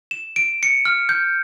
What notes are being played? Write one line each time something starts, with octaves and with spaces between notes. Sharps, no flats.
E7
D7
C#7
F6
G6